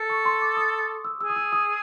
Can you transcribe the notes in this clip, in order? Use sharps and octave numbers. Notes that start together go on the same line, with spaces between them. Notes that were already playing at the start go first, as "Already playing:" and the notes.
Already playing: A4
C#6
C6
D6
D#6
E6
G#4 E6
D#6
E6
D#6